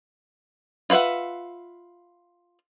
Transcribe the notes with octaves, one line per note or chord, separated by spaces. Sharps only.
F4 B4 C5 E5 F#5